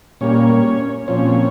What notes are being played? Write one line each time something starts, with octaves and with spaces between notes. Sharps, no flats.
A#2 G3 A#3 C#4 C#5
A#2 F3 C4 C#4 C#5